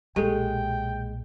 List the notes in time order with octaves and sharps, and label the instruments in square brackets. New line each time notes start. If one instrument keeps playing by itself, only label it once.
[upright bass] B1 A#2 [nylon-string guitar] G#3 [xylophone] G4 A4 [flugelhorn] G5